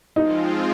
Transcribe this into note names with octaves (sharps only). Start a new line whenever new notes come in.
F3 G#3 C4 D#4 F4